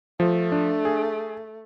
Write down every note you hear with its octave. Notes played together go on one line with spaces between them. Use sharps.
F3 A3
D4
G#4